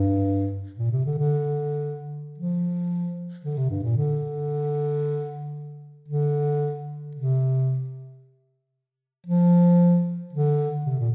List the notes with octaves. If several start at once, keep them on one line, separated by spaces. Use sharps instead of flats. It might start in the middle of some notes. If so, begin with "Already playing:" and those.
Already playing: G2
A#2
C3
D3
D3
F3
D3
C3
G2
A#2
D3
D3
C3
F3
D3
C3
A#2